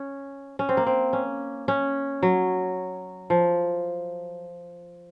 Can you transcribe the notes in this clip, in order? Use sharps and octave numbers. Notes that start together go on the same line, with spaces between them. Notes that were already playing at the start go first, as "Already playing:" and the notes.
Already playing: C#4
C#4
C4
A#3
C4
C#4
C#4
F#3
F3